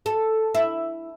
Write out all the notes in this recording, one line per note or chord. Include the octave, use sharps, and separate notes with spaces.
A4
E4